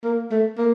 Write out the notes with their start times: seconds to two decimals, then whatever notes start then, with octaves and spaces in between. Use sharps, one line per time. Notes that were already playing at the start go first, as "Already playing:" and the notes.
0.04 A#3
0.31 A3
0.58 A#3